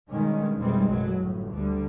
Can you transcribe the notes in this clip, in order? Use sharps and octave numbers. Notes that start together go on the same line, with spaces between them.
G2 B2 D#3 G#3 C#4
F1 B2 E3 G3 G#3 C4
A1 F#2 B2 F#3
G1 A2
D2 D3 G3